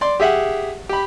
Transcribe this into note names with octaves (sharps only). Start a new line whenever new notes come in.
D5 C6
G4 G#4 E5 F#5
G4 B5